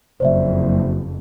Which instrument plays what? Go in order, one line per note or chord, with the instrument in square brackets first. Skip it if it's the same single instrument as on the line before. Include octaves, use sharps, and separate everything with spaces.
[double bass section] F#1 F2 [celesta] C5 D5 E5